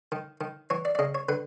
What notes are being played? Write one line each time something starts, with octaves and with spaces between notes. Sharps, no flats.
D#3
D#3
E3 C#5
D5
D5
C#3 D#5
C#5
D3 B4